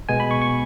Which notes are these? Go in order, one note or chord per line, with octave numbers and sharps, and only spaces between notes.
B2 G#3 B3 G#5
B5
C#6
C#6